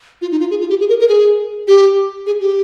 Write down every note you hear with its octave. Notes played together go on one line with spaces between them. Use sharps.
F4
D#4
F4
G#4
F4
G4
G#4
A#4
A#4
G#4
G4
G#4
G4